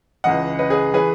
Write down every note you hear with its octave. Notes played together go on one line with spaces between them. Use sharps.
C#2 C#3 E3 D#5 F#5
B4 D#5
G#4 B4
E3 G#4 B4